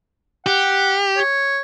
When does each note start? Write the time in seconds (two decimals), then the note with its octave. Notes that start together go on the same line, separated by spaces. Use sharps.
0.46 G4 F#5
1.17 C#5